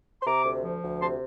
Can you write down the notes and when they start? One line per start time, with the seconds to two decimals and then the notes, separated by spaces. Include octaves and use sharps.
0.22 C6
0.26 C3 A#5 D6
0.45 D2
0.64 F3
0.83 D2
1.01 C3 A5 C6